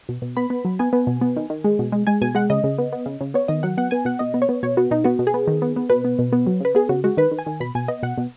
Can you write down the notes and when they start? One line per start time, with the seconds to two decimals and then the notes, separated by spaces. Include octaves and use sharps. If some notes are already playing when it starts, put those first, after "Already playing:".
0.09 B2
0.22 B2
0.37 B3 B5
0.50 B3
0.65 F#3
0.79 B3 G#5
0.93 B3
1.07 B2
1.21 B3
1.37 D#3
1.50 D#3
1.64 G#3
1.79 B2
1.92 G#3
2.07 G#3 G#5
2.22 B2 G#5
2.35 G#3 F#5
2.50 C#3 D#5
2.64 C#3
2.78 B3
2.93 B3
3.06 C#3
3.21 C#3
3.34 B3 C#5
3.48 D#3 D#5
3.63 F#3 F#5
3.78 B3 F#5
3.91 B3 G#5
4.05 B2 F#5
4.19 B2 D#5
4.34 B3
4.42 C#5
4.49 B3
4.63 B2 C#5
4.77 B3 F#4
4.91 B2 D#4
5.04 B3 F#4
5.19 B2
5.27 G#4
5.34 B3
5.47 D#3
5.62 B3
5.76 B3
5.90 B2 B4
6.04 B3
6.19 B2
6.32 B3
6.47 F#3
6.60 C#3 B4
6.75 B3 G#4
6.89 C#3 F#4
7.04 G#3 F#4
7.17 D#3 B4
7.31 D#3
7.39 G#5
7.46 D#3
7.60 B2 B5
7.75 B2 G#5
7.88 B3 D#5
8.03 B2 F#5
8.18 B2